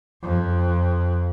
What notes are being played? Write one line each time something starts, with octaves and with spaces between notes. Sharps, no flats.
F2